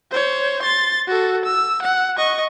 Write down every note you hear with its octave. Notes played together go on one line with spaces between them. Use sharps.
C5 C#5
C6 A6
F#4 A4
E6
F#5
D#5 C#6